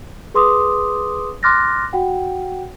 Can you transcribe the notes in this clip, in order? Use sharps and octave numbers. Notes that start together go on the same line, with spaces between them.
G#4 B4 C6 D6 D#6
C6 D6 F6 F#6 A6 A#6
F#4 F#5 G5